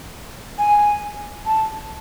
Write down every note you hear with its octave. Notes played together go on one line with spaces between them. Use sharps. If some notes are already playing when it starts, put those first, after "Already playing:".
G#5
A5